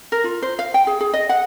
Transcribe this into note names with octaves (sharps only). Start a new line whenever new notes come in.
A#4
F4
C5
F5
G5
G#4
G#4
D#5
F#5